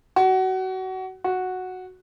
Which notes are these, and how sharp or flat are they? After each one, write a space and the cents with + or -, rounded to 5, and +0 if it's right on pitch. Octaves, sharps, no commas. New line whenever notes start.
F#4 +25
F#4 -5